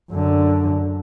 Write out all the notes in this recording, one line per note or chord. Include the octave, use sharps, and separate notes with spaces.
F#2 D3